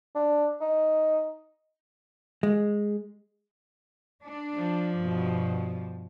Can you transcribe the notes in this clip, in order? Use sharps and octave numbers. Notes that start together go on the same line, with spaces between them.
D4
D#4
G#3
D4
F3
G2 B2